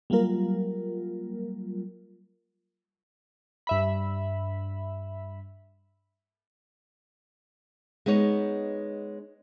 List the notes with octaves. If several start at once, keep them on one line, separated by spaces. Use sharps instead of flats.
F#3 G3 A#3 F4 A#4
G2 E5 B5
G#3 B3 D#4 C#5